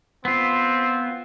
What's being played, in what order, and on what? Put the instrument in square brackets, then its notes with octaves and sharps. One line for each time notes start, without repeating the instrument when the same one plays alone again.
[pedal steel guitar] B3 F4 [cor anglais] C4